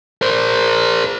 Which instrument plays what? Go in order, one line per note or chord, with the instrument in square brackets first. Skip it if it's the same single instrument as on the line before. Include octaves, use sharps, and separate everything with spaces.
[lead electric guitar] A#4 C5